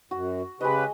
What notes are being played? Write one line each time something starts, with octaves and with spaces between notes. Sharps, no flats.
F#2 F#4
C#3 G#3 G4 B4 C#5 D#5